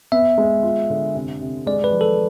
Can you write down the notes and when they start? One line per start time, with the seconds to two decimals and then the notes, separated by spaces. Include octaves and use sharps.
0.12 B3 E5
0.38 G#3
0.63 F4
0.90 D3
1.15 C3
1.41 C3
1.67 G#3 D5
1.84 B4
1.92 F3
2.01 A4